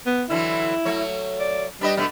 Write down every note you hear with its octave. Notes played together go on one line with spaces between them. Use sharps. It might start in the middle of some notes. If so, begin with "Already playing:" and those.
B3
D3 E3 F#3 E4
F#3 A3 C#5
D5
G3 D4 B4 D#5
B2 A3 D4